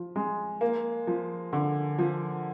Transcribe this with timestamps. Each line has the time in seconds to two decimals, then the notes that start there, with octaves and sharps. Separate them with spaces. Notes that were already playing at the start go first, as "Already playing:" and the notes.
Already playing: F3
0.16 G#3
0.61 A#3
1.07 F3
1.53 D3
1.98 F3